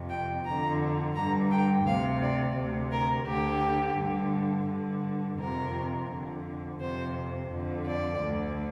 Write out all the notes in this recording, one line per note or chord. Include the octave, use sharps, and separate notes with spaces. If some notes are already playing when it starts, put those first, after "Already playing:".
Already playing: F2 C3
G5
F2 D3 A#5
G2 D3 A#5
G5
D2 C3 F5
D5
D2 C3
A#4
D2 D3 G4
G2 D3
G2 D3
F2 C3 A#4
F2 D3
F2 C3 C5
F2 D3
D5
D2 D3